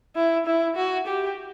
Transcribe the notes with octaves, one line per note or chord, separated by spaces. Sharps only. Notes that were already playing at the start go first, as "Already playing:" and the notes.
E4
E4
F#4
G4